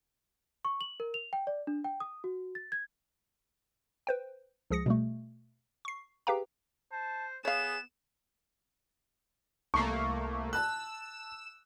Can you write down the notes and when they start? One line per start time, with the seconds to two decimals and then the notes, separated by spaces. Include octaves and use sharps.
0.65 C#6
0.81 F#7
1.00 A#4
1.14 F7
1.33 G5
1.47 D5
1.67 D4
1.84 G5
2.00 D#6
2.24 F#4
2.55 A6
2.72 G#6
4.07 B4 C5 G5
4.70 C#2 F3 G#4 D#6 A#6 C#7
4.86 B2 G3 A3
5.85 C#6 C7
6.27 G4 G#4 B4 F5 G5 A#5
6.92 C5 A5
7.45 B3 G#4 C#5 F5 E7
9.74 C2 A3 A#3 C#6 C7
10.53 A5 E6 F#6 E7